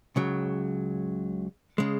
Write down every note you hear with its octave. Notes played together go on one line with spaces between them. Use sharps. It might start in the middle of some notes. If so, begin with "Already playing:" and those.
C#2 C#3 F#3
C#3 G#3